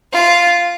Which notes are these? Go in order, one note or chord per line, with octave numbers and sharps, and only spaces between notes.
F4